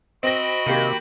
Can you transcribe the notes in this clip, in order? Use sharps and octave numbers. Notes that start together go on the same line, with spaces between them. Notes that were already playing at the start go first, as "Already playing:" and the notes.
C4 F#4 D#5 G5 B5 A#6
C3 D#3 A#3 G4